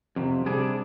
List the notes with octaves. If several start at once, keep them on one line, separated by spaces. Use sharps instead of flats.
F2 C3
C3 G3 D4 G#4